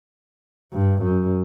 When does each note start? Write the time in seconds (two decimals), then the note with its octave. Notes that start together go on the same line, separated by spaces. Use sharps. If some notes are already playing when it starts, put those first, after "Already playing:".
0.73 G2
1.03 F#2